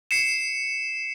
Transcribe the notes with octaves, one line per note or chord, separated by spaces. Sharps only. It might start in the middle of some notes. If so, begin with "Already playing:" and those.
C7 C#7 E7